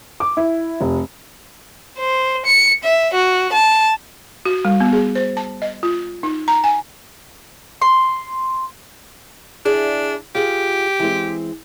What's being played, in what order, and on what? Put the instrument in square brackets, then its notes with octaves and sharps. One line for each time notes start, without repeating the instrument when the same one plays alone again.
[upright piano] D6
E4
F1
[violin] C5
C#7
E5
F#4
A5
[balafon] F#4
G3
B3
G#4
C5
A5
D#5
F4
D#4
A#5
G#5
[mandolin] C6
[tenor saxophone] D4 [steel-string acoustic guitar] E4 G#4 D5
[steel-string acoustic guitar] F4 G#4 F#5 [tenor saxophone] G4
[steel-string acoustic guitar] E3 G#3 C4